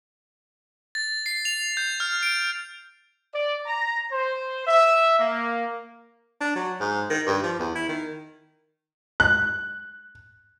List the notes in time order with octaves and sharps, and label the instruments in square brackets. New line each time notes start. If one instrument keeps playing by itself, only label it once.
[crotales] A6
C7
F7
G6
F6
D7
[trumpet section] D5
A#5
C5
E5
A#3
[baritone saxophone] D4
F#3
G#2
D#3
G2
F3
E2
E4
D#3
[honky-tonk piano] F#6